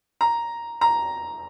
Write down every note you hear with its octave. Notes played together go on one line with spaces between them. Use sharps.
A#5
A#5